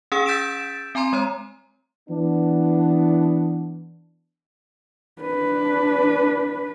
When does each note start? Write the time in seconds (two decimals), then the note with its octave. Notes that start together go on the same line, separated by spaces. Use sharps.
0.12 C#4 G#4 G5 E6
0.26 E6 G6 A6 B6 D7 E7
0.95 C4 G#5 A#5 C6
1.13 G#3 C#5 A#5
2.08 E3 B3 D4
5.22 D4 B4